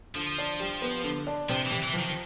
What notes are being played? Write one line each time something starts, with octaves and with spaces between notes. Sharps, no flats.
D3 F3
D4
G3
B3
D3
D4
C3 F3
E3
C3
E3
F3
D#3